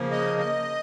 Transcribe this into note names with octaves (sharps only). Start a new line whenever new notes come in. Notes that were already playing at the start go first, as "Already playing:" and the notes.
Already playing: C#3 F3 A#3
D#5
D#5